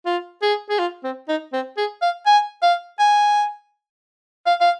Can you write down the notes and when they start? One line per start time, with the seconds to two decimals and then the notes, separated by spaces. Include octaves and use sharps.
0.06 F4
0.42 G#4
0.70 G#4
0.79 F4
1.04 C4
1.28 D#4
1.53 C4
1.77 G#4
2.02 F5
2.26 G#5
2.62 F5
2.99 G#5
4.46 F5
4.61 F5